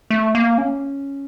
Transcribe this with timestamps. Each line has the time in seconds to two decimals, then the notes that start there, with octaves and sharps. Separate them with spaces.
0.10 A3
0.35 A#3
0.58 C#4